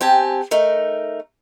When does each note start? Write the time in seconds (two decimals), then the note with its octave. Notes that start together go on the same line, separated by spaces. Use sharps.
0.01 C4 G4 G#5 A5
0.51 A3 D#4 A#4